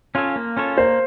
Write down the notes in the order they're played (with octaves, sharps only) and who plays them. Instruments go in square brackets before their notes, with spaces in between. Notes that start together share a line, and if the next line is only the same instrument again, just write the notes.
[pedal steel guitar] C#4 F4 A4 C#5
A#3
C#4 F4 A4 C#5
[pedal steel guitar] A#3 [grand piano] C5